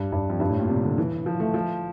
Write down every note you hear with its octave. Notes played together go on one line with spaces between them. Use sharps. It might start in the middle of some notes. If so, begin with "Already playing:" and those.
Already playing: G2
G2
F2
G2
A2
A#2
C3
D3
E3
F3
A3
F3